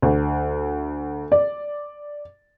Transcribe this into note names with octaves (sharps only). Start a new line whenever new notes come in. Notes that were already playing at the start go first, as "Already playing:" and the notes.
D2
D5